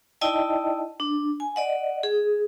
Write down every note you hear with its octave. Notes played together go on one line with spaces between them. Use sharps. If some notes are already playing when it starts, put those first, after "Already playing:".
D#4 E4 D5 D#5 G5 A5
D4
G#5
D5 D#5 F#5
G#4